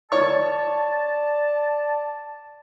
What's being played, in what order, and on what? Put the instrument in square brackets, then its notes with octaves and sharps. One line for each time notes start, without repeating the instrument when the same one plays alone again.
[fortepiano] C#5 C#6 [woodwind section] D5 A5